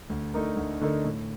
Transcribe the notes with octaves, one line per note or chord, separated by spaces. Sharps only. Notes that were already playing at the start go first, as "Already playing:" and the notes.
D2
D3 A3 D#4 A#4
D2
D3 A3 D#4 A#4
A2